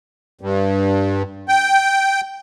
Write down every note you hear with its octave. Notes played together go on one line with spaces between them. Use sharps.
G2
G5